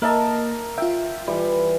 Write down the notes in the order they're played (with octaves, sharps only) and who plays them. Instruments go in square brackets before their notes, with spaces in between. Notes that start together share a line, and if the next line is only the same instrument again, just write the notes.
[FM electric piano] A#3 D#5 [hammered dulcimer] A#4 E5 A5
[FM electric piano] F4 E5 [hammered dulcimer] G5
[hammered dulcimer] E3 G3